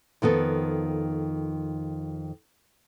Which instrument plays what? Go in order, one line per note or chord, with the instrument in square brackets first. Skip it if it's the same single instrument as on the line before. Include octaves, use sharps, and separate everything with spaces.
[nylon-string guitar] F2 D#3 B3 A4